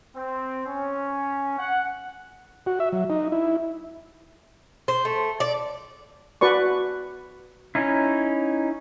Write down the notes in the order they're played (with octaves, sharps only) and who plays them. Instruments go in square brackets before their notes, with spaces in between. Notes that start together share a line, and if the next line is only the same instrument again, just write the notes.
[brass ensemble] C4
C#4
F#5
[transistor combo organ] F#4
E5
F#3
D#4
E4
[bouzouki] C5
A3
D5
[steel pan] F#4 B4 D5 C#6
[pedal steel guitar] C#4 D#4 E4